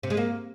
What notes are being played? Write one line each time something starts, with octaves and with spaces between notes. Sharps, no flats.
C3
G#3
A#3